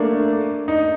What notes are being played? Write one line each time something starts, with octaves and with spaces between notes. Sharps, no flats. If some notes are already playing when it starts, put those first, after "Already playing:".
Already playing: A3 A#3 D4
D#4